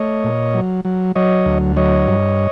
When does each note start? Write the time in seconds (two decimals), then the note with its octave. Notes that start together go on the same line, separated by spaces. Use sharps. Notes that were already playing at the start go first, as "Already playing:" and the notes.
Already playing: A3 C#5 D#5
0.24 A#2
0.54 F#3
0.85 F#3
1.15 F#3 C#5 D#5
1.46 D2
1.76 F#3 C#5 D#5
2.07 G2